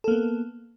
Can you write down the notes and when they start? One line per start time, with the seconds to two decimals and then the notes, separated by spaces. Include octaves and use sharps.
0.04 A4
0.08 A#3
0.11 B3